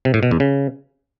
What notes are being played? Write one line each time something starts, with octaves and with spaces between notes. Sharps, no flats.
C3
A2
B2
E2
C#3